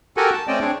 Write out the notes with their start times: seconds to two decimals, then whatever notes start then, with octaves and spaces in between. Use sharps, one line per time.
0.17 F#4 G4 A4 A#4 F#5 G#5
0.33 A5
0.48 A3 C4 C#4 D5 D#5 G5
0.61 C4 D4 G#4 C#5